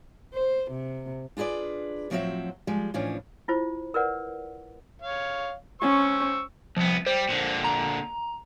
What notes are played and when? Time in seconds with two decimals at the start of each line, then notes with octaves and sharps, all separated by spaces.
0.34 C5
0.71 C3
1.37 D4 F4 G#4 B4 D5
2.10 A2 F3 F#3 C4 F#4 E5
2.67 F3 G3 G#3
2.94 A2 E3 F3 C#4 D4
3.48 E4 F4 C5
3.94 A#4 B4 D5 F#5
5.02 C#5 F5
5.81 C#4 C5 C#6 E6
6.77 C2 F3 B3
7.06 G3 C5
7.29 A#2 D3
7.64 A#5